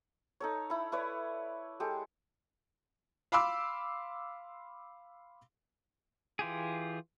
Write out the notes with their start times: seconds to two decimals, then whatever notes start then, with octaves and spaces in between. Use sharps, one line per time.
0.40 D#4 A4 C#5
0.70 E4 B5
0.92 E4 B4 C#5 D5
1.80 G#3 G4 A4
3.32 F5 B5 C6 D6 E6
6.39 E3 F4 G4 G#4